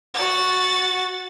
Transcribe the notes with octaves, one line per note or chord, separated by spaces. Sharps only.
F#4 A6